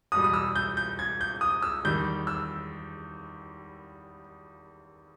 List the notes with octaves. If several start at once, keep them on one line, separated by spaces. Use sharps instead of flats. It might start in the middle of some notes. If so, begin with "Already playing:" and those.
E2 B2 G3 D#6
D#6
E6
G6
G6
G#6
G6
D#6
E6
E2 D#3 G3 G6
E6